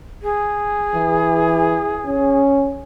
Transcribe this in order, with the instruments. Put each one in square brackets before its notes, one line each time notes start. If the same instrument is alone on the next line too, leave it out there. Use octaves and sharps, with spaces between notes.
[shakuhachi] G#4
[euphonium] E3
C#4